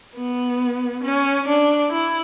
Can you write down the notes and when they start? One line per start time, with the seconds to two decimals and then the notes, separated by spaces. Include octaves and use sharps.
0.16 B3
1.03 C#4
1.47 D4
1.92 E4